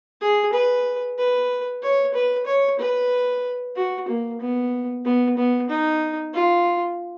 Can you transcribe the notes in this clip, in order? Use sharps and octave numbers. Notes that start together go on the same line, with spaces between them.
G#4
B4
B4
C#5
B4
C#5
B4
F#4
A#3
B3
B3
B3
D#4
F4